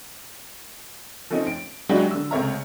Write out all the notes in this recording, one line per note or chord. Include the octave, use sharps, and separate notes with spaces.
F3 A3 C4 C#4 D#4
D7
F#3 G#3 D4 E4 F#4 G4
D3 E6
C#2 C3 A3 C#5 E5 A#5